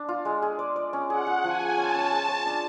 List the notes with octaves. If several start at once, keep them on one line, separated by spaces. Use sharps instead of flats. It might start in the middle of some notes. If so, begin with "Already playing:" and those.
Already playing: D4
F4
G#3
G#4
D5
D5
C#4
G#4 F#5
G#4
F3 G#5
G#4
C#4 A5
C#4
G#4
C#5
D4